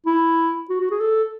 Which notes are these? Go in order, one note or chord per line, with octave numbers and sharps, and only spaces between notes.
E4
F#4
F#4
G#4
A4